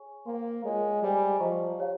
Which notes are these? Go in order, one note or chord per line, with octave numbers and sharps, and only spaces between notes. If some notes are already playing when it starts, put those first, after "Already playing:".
Already playing: G#4 C#5 G#5 C#6
A#3 C5 G5 C6
G#3 F4 A#4 C#5
G3 G#4 C5 D#5 G#5
F3 C5 D#5 A#5 C#6
G4 C#5 F5